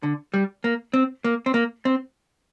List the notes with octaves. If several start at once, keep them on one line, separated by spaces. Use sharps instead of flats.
D3
G3
A#3
C4
A#3
C4
A#3
C4